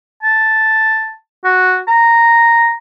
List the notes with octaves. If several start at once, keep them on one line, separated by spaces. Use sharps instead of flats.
A5
F#4
A#5